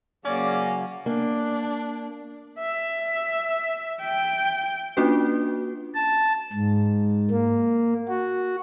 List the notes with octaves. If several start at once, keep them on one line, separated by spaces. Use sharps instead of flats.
C#3 F#3 A#3 C#4 D5
A#3 D4
E5
G5
A#3 C#4 D4 F4 F#4 B4
A5
G#2
A#3
F#4